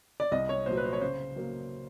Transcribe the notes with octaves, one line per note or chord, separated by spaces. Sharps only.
D5
C2 D#5
C#5
A#2 F#3 C5
B4
C5
C#5
C#3 C5
F#3 A#3